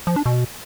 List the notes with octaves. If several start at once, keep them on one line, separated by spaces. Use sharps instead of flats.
F3
D4
B2